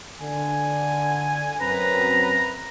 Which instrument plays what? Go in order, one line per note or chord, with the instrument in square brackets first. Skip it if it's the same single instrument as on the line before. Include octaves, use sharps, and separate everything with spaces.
[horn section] D3 [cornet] G#5
[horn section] F#2 C4 [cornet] B4 [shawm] A#5